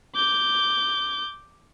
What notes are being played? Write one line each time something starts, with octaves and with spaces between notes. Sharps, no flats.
D6 G6